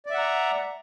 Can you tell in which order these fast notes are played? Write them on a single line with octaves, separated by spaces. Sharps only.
D5 E5 F#5 A#5